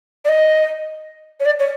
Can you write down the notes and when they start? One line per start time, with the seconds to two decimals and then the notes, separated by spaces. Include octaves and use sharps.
0.24 D5
0.28 D#5
1.40 C#5
1.45 D5
1.59 C#5